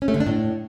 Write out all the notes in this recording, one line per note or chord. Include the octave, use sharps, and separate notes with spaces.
C#4
A3
D3
D4
A2